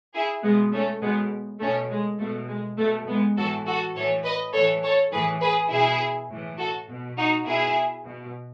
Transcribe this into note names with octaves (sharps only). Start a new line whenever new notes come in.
E4 G#4
B2 G#3 B3
A3 C#4
B2 G#3 B3
B2 A3 C#4
G#3
B2 A3
G#3
B2 A3
G#3 B3
A2 E3 F#4 A4
F#4 A4
A2 E3 A4 C#5
B4 D#5
A2 E3 A4 C#5
A4 C#5
A2 E3 G#4 B4
G#4 B4
B2 E4 G#4
A2 E3
F#4 A4
B2
D#4 F#4
B2 E4 G#4
B2